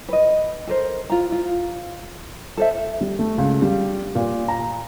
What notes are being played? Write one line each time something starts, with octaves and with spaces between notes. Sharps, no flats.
B4 D#5
A4 A#4 C5
F4 A#5
F4
A4 C5 E5
G3
A3
C#2
G3
A#2
A#5